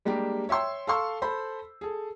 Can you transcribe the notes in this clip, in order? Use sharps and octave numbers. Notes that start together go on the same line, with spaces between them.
G3 G#3 A#3 D4 G4
C#5 E5 G5 C6 E6
A4 F5 C6 C#6 E6
A4 C5 B5
G#4 A4